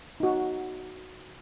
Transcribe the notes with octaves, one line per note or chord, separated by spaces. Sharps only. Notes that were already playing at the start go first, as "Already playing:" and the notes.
D#4 F#4